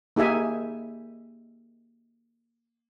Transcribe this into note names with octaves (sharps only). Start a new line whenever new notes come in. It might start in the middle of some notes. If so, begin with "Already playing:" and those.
A#3 D#4 G4 G#4 E5 G#5